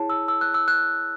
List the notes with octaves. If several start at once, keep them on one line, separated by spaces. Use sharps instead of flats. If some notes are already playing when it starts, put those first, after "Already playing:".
Already playing: E4 G#4 C#5 A5
E6
E6
F#6
E6
F#6